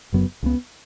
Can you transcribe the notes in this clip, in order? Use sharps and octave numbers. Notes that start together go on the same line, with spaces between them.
F#1 F#2 F#3 B3
C#2 C#3 B3